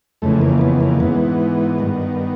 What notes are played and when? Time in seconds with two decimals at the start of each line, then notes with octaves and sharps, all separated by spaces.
0.22 F2 C#3 E3 A3
0.41 A#3
0.61 B3
0.81 A#3
1.00 G#2 E3 B3
1.79 G2 D#3